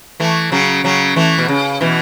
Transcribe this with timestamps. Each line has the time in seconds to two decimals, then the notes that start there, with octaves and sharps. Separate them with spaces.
0.20 E3 A3
0.52 C#3 F#3
0.84 C#3 F#3
1.16 E3 A3
1.38 B2
1.48 C#3
1.81 B2 E3